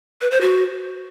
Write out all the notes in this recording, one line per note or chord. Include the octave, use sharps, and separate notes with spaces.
B4
C5
F#4